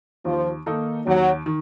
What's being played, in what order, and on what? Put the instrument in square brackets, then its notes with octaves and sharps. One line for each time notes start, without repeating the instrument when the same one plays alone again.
[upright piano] D#2 [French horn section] F3
[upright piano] D#3 A#3 D#4 A4
[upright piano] D#2 [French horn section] F#3
[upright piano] D#3